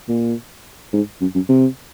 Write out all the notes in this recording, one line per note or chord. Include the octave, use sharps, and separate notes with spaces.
A#2
G#2
F#2
F#2
C3